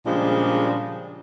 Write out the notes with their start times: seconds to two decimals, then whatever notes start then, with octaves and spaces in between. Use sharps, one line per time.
0.05 A#2 C#3 F3 G3 G#3 D4